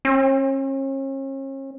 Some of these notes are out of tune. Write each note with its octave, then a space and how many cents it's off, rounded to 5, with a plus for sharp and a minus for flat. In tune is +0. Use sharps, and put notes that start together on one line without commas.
C#4 -40